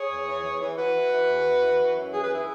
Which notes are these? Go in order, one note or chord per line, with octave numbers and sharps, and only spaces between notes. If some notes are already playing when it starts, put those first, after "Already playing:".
Already playing: G#4 C#5
E2
E3
E3
E3
E3 F#4 B4
E3
E3
E2
E3
E3
E3
F#2
E3 G#4
B4
E3 E4 G#4